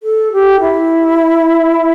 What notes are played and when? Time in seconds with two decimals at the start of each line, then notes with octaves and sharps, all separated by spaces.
0.03 A4
0.33 G4
0.60 E4